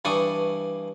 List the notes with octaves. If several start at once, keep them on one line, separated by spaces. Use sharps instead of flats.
G2 E3 D4 C#6 D#6